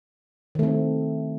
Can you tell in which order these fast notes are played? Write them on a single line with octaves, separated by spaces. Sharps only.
D#3 A3 C4